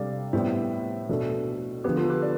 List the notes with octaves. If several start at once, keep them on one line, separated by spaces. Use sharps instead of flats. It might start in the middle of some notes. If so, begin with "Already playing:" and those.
Already playing: C3 G3 D4 A4 D5 F5
A2 G3 B3 C5 E5
B2 A3 D4 A4
D3 F3 B3 G4 B4
F4 A4
G4 B4
B4 D5